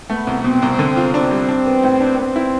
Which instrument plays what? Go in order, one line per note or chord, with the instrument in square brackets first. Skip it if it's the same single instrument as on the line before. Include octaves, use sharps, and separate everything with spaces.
[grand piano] A3 [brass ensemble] B3
[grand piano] C2
[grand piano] B2 [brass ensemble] C4
[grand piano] C2
D3
F4
[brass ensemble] C4 [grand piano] D4
[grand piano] G3
D4
B3
A2
D4
[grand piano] B3 [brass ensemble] C4
[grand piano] E4